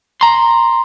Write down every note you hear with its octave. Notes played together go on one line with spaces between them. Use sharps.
A#5 C6